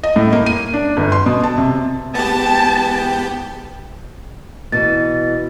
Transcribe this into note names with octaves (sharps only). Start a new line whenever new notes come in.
D#5
A2
A#3
D#7
D4
G1
C6
B2
A5
C3
G#2 E3 B3 G4 G5 A5
B2 E3 A6